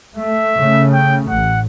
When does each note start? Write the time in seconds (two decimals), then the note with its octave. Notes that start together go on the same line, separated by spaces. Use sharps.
0.16 A3 E5
0.56 C#3 A3
0.93 G5
1.29 A1 F#5